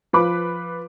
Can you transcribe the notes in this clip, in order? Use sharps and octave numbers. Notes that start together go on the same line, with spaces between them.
F3 B4 B5 D6